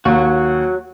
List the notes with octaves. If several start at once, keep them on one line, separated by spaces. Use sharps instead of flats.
D#2 F#3 F#4